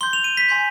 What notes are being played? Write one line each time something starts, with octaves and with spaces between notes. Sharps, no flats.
C6 G6 G7
F7
D#7
B6
G#5 C6 G6